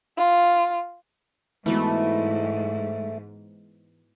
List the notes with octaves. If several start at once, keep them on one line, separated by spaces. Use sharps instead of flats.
F4
G#2 E3 A3 B3 F#4